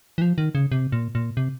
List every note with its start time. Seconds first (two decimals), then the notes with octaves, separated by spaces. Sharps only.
0.18 E3
0.22 F3
0.38 D#3
0.55 C#3
0.72 C3
0.92 A#2
1.15 A#2
1.37 C3